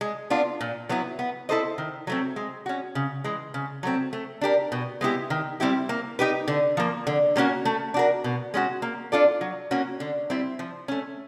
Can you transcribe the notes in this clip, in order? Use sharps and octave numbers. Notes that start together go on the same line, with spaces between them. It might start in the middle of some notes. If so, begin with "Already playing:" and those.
G#3
B3 D4 F4
A#2
F#3 B3 E4
B3
E4 A4 C5 D#5
D#3
F#3 A3 C4
G#3
C#4 F#4
C#3
E3 G#3
C#3
F#3 A3 C4
A3
D4 G4 A#4
B2
G#3 B3 E4 G4
D#3
G3 C4 E4 G4
A#3
D#4 G4 B4
D3
F3 A#3
D3
G3 A#3 C#4 F#4
A3
D4 F#4 A#4
B2
G#3 C#4 F#4
A#3
D4 F4 A4 D5
F#3
A#3 C#4 F#4
D3
G3 C4 E4
F3
A3 C#4